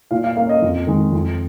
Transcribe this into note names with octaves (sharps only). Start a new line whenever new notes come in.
A#2 F5
F5
A#3 C#4 F5
D#5
F2
D#3 G#3
F2